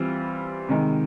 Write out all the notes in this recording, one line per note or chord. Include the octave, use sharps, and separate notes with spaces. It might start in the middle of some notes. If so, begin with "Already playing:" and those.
Already playing: E3 G3 C4 F4
C3 D#3 G#3